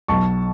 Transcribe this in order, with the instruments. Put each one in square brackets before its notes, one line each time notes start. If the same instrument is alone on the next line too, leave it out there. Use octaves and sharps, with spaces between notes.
[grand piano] B1 B2 F#3 A5 C#6